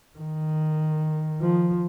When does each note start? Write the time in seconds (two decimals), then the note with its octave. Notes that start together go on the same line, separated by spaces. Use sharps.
0.19 D#3
1.41 F3